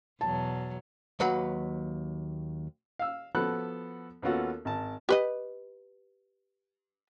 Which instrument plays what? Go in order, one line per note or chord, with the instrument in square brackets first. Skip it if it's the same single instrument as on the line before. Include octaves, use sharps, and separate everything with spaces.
[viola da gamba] E2 B2 F#3 [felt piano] A5
[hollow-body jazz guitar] D#2 F#3 B4 F#5 B5
[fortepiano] F5 E6
F3 B3 F#4 A4 B5 F#6
D#2 B3 C#4 F4 F#4 A4
G#1 A5
[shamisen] G4 B4 D#5